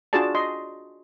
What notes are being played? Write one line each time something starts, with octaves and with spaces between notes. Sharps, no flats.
D4 F4 F#4 G#4 D5 A5
D#5 C6